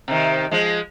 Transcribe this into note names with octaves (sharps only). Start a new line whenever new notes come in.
C3 D#3
F3 G#3